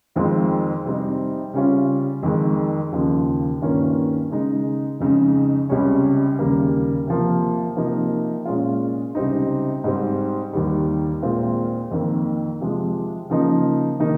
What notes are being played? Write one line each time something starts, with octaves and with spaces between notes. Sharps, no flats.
F2 D#3 G#3 C4 F4
C3 G3 C4 D#4
C#3 G3 C#4 F4
F2 D#3 G#3
D#2 C#3 F3
G2 D#3 A#3 C#4 F4
C#3 G#3 D#4
F2 C#3 G#3 D#4
C#2 C3 G3 C#4
D#2 C#3 G3 A#3
C3 F3 A#3
C3 F3 A#3 D#4
A#2 G#3 C#4 F4
C#2 C3 G3 C4 D#4
G#2 G3 C4
D#2 D#3 G3
A#2 G#3 C4 F4
F2 D#3 A#3
C3 F3 G#3
C#3 F3 A#3 D#4
C3 D#3 A#3 D#4